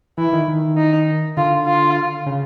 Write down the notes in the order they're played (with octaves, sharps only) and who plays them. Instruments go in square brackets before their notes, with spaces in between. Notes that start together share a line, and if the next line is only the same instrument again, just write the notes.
[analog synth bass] E3 [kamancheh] E4
[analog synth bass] D#3
D#3
[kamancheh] D#4
[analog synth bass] D3 [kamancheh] F4
[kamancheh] F4
[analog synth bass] C#3